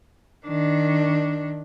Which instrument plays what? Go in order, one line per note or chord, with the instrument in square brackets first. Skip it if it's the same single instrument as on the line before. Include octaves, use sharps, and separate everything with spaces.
[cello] D#3 D4